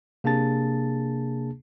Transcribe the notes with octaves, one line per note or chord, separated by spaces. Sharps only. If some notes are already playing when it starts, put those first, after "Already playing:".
C3 A#3 D4 G#4 A5 A6